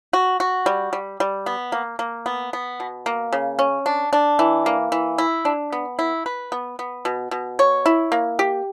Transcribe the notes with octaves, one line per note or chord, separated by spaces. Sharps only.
F#4
F#4
G3
G3
G3
B3
A#3
A#3
B3
B3
B2
A#3
C#3
C#4
D4
D4
E3
A#3
E3
E4
D4
B3
E4
B4
B3
B3
B2
B2
C#5
E4
A#3
G4